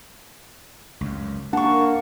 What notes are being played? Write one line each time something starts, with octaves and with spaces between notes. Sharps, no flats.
C#2 F#2
A#3 D4 F#5 A5 C#6